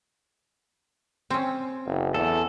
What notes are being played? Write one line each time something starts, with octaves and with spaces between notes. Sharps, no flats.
C4 C#4
F#1
E2 A4